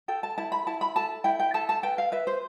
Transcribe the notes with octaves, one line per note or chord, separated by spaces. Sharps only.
A4 G5
A5
E4 A5
B5
E4 A5
B5
A4 A5
E4 G5
G5
A4 A5
A5
B4 G5
F5
B4 E5
C5